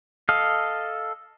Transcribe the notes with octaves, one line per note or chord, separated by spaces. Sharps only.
A4 D#5 F5